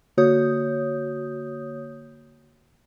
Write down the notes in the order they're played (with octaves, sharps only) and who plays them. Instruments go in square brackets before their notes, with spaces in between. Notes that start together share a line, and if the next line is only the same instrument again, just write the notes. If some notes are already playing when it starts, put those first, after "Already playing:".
[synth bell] D3 A#3 F#4 C#5 D#6 G6